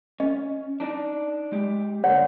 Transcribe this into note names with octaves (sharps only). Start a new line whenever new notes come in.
C#4 D#5
D4 D#4 D5
G#3 G4
G2 D3 A#3 C#5 D5 F#5